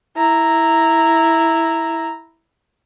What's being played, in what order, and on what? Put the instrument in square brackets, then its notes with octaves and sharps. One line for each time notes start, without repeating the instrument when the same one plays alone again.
[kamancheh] E4 A#5